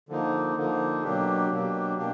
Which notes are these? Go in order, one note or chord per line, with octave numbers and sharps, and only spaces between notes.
D3 F3 A#3 D#4
D3 F3 A#3 D#4
B2 F#3 A#3 D4 G4
B2 F#3 A#3 D4 G4
B2 A#3 D4 G4